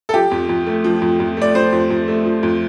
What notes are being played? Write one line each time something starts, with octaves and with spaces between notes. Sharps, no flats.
A4
F3 G4
F2
F2
A3
F3
F2
F2
A3 D5
F3 C5
F2
F2
A3
F3
F2